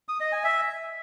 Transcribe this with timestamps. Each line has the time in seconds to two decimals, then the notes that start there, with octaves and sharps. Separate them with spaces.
0.09 D#6
0.20 D#5
0.32 G#5
0.44 E5